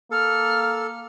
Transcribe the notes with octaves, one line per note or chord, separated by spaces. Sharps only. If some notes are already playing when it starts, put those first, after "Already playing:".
A#3 A4 F6